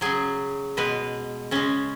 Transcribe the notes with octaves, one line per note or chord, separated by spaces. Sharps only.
C#3 F#3 G#4
B2 G#3 B4
C#3 G#3 C#4